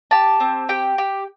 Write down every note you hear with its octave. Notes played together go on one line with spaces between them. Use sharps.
G4 A5
C4
G4 G5
G4